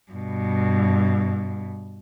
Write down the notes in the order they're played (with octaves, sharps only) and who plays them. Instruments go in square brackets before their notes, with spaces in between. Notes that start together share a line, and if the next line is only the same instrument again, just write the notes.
[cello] G2 B2